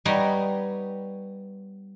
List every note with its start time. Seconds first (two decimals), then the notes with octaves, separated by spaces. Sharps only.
0.05 G3 B3 D#4 C#5